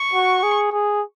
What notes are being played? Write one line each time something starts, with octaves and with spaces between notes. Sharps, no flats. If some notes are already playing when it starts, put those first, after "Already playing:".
Already playing: C#6
F#4
G#4
G#4